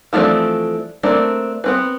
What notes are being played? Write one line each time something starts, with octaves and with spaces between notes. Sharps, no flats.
E3 F3 A3 C4 D4
A3 A#3 C4 D4
B3 C4 B4